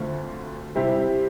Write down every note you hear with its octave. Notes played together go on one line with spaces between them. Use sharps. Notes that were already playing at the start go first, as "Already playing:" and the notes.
Already playing: D2 D3 A3 C4 F4
C3 G3 C4 E4 G4